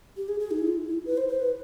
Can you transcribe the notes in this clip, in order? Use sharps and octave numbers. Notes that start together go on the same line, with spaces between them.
G4
G#4
G#4
D#4
E4
F4
E4
B4
C5
C5
B4